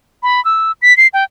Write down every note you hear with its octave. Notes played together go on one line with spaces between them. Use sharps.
B5
E6
B6
C7
G5